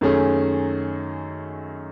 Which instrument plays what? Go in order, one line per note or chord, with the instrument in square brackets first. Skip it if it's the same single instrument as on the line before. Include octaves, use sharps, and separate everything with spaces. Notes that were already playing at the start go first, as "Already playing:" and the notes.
[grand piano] F#2 D#3 A3 C#4 G#4